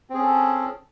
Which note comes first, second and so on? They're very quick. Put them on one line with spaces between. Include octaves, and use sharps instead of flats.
C4 G#4 C#4 A4